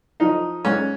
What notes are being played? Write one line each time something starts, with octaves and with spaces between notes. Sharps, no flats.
F3 D#4
G#2 C#4